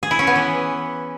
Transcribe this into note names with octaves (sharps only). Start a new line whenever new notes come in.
G#4
E4
C#4
B3
E3